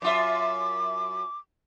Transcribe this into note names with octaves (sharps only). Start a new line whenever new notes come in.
F#2 F4 E5 D6